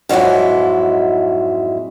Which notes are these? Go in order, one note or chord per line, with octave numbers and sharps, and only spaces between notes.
F2 G#2 F#3 G#3 E4